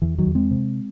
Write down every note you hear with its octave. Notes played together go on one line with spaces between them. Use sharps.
E2 E3
D#3 F#3
E2
G#3 C4
C3